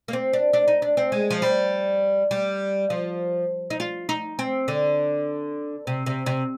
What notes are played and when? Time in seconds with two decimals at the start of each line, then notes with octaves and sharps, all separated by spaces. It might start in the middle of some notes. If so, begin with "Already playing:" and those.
0.08 A#3
0.13 C4
0.33 D4
0.53 D4
0.68 D#4
0.82 D4
0.97 C4
1.12 G#3
1.30 F3
1.42 G3
2.31 G3
2.90 F3
3.70 D#4
3.80 F4
4.09 D#4
4.39 C4
4.68 D3
5.87 C3
6.06 C3
6.26 C3